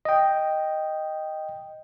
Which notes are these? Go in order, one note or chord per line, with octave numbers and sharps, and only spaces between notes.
D#5 G5